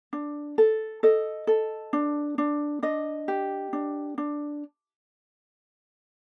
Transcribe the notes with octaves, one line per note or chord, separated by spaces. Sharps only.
D4
A4
A4 D#5
A4
D4
D4
D4 D#5
G4
D4
D4